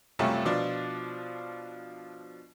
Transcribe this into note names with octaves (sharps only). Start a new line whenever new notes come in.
F#2 C3 G3 A3 C#4 F4
B2 F3 D4 F4